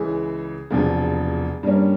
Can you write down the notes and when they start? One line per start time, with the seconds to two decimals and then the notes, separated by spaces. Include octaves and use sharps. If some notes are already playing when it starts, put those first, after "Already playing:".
Already playing: C#2 C#3 E3 G#4
0.71 E1 E2 C3 F3
1.63 G2 G3 A#3 C#4